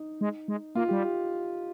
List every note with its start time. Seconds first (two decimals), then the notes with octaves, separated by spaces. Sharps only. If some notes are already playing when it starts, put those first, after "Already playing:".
Already playing: D#4
0.21 G#3
0.48 G#3
0.75 A#3 F4
0.88 G3 G4